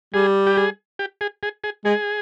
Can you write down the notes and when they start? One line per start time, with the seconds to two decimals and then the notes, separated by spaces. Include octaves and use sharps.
0.14 G3 G#4
0.47 G4
0.57 G#4
0.99 G4
1.21 G#4
1.43 G#4
1.64 G#4
1.85 G#3 G#4